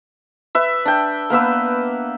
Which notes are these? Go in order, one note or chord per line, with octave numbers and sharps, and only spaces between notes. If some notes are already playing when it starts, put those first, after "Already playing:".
B4 E5
D4 G5
A#3 B3 B4 E6